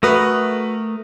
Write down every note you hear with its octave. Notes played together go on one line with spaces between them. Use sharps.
A3 F#4 A#4 B4 D#6